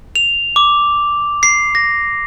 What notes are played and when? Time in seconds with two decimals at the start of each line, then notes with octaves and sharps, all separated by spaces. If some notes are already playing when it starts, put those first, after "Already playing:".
0.15 F7
0.56 D6
1.43 C7
1.75 A#6